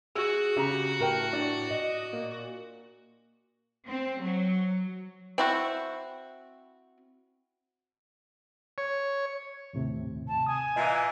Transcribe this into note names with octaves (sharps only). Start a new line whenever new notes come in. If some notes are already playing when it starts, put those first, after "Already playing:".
F#4 G#4 E6
C#3 G4 A#5
A2 A#4 G5
D4
D#5
A#2
C4
F#3
C4 E4 F#4
C#5
D#2 A2 C3
A5
G#5 D#6
A#2 E3 D#5